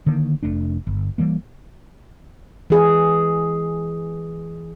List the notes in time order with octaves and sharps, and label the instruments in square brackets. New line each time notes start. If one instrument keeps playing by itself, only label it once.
[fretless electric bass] D3 D#3 A#3
F1 A3 D4
G1
E3 G3 A#3
[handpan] E3 G#4